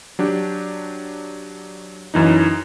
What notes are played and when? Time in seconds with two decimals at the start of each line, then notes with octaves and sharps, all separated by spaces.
0.19 F#3 D4 G4
2.14 F#2 E3 D#4